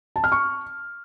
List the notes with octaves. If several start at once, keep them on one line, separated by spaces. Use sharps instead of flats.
A5
F6
C#6